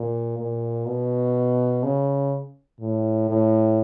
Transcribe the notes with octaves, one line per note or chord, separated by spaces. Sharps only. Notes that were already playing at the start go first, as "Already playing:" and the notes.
Already playing: A#2
A#2
B2
C#3
A2
A2